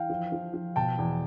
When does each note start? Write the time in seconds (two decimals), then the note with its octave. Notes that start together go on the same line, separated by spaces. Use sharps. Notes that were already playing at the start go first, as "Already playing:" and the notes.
Already playing: E3 F5 G5
0.10 F3
0.32 F3
0.54 F3
0.76 B2 G5 A5
0.99 E2